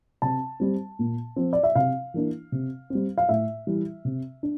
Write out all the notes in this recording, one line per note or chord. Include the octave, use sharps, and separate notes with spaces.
C3 A5
G3 C4
A#2
F3 C4
D5
E5
C3 F5
E3 A#3 D4
C3
G3 C4
F5
A2 E5
E3 G3
C3
D4